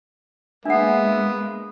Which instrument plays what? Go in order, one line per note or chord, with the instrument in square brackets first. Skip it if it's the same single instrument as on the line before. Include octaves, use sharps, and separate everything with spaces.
[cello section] G#3 A#3 [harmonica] B3 [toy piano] D4 F#5 [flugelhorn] E5